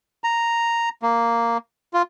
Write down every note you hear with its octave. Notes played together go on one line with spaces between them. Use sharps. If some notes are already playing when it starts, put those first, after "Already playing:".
A#5
A#3
F4